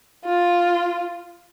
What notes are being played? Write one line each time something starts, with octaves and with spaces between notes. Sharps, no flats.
F4